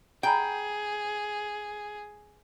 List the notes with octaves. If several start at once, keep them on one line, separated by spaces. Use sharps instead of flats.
G#4 G5 G#5 A#5 B5